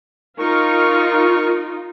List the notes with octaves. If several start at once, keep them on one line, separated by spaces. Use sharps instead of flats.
D#4 F4 A#4 C#6